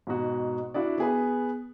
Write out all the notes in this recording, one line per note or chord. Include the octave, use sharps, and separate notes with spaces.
G#2 B2 F#4
D4 E4 F#4 D5
B3 G#4 B4